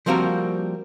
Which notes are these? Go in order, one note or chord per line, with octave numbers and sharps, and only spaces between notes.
F3 G3 A#3 C4 F#4 A#4